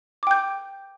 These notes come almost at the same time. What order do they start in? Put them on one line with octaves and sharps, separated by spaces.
D6 G5 G6